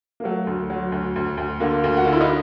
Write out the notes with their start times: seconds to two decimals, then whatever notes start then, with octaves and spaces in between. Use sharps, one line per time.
0.20 A#3
0.24 F#3 A3
0.47 D2
0.70 F#3
0.92 D2
1.16 D2
1.37 D2
1.60 D3 A#3
1.84 D2
1.97 F#4
2.05 D3 F4
2.13 E4
2.21 D#4